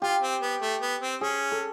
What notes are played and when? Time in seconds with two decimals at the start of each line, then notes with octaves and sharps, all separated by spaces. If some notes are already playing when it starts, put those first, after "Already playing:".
0.02 F4 G4
0.22 C4
0.41 B3
0.61 A3
0.81 B3
1.01 C4
1.21 C#4 G#4
1.52 A4